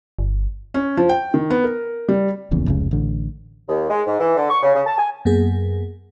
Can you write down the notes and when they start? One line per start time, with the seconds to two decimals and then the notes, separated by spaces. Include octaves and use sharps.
0.19 G1
0.74 C#4
0.97 F3
1.09 G5
1.34 D#3
1.50 B3
1.64 A#4
2.09 G3
2.51 D#1 A#1 E2 C#3
2.66 F1 C#2 C#3
2.91 A1 D3
3.69 D#2
3.90 G#3
4.07 G#2
4.20 E3
4.36 D3
4.50 C#6
4.63 C#3
4.75 C#3
4.86 A5
4.98 G#5
5.25 F#2 A#3 B3 G#4